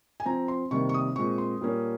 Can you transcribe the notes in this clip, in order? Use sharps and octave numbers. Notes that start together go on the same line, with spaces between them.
G#5
F3 C4 A#5
C6
C3 D#3 G3 A#3 C#6
C#6
D#6
A#2 G#3 C4 C#6
C6
A#2 G3 A#3 C#4